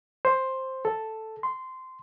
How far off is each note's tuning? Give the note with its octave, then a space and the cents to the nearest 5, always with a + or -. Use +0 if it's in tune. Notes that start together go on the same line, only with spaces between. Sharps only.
C5 +5
A4 +0
C6 -15